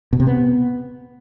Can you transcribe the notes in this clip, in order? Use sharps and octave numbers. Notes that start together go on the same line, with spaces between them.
B2
C3
B3